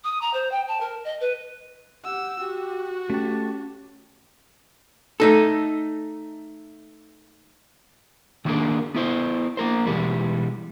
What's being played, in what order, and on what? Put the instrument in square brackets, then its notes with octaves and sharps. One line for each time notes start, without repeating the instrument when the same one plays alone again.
[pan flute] D#6
A#5
C5
G5
A5
A#4
D#5
B4
[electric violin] G4 E6 [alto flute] F#5
[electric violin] F#4 [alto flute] G4
[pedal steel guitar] A3 A5 [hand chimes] C#4 [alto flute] G4
[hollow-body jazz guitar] A3 D#4 A4
[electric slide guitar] D#3 F#3 A#3 D4 G#4 A#4
B3 E4 C5
A#3 A#4 C5
B2 E3 G3 G#3